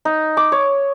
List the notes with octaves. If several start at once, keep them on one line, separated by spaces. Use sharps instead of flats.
D#4
D6
C#5